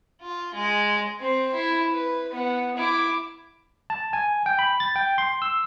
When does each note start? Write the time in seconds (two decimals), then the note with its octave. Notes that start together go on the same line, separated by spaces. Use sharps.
0.21 F4
0.54 G#3
1.20 C4 C5
1.54 E4
1.91 B4
2.31 B3 F#5
2.76 E4 D6
3.90 A5
4.13 G#5
4.46 G5
4.59 B5
4.80 A6
4.96 G5
5.18 C6
5.42 E6